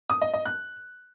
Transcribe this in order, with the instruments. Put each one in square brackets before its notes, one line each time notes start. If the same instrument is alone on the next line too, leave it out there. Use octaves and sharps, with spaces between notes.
[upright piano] D#6
D#5
D#5
F#6